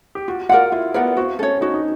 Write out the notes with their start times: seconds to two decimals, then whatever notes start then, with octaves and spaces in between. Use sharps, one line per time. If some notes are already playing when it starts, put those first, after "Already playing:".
0.15 G4
0.28 F4 F#4
0.49 F4 A#4 D5 F#5
0.72 E4 F4
0.94 B3 A#4 D5 F#5
1.17 C4 F#4
1.39 C#4 A4
1.43 C#5
1.61 D#4 F#4
1.74 D#4